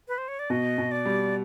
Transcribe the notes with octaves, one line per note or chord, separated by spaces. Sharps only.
B4
C5
C#5
D5
B2 D#5
B2
D5
G3